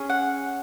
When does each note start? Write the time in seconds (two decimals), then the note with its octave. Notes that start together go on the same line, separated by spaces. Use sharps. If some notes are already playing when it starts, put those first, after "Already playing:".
Already playing: C#4 G#4
0.10 F#5